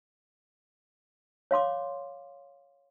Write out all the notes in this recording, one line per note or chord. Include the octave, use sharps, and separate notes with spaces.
C#5 F5 C6 D6